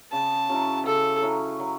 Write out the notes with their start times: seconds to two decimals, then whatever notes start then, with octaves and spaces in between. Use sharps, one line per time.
0.12 C#3 A5
0.49 F#3 C#4 E4
0.86 C#3 A4
1.22 F#3 C#4 E4
1.60 F#3